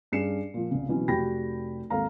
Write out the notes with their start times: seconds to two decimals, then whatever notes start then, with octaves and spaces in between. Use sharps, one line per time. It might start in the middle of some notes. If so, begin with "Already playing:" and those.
0.12 G2 C#4 G#4 C7 C#7 E7
0.54 A#2 F3
0.71 C2 C#3
0.88 B2 E3 F#3 C4 C#4
1.08 F1 F#4 G4 G5 B5 A#6
1.90 G#1 D#2 A4 F5 A#5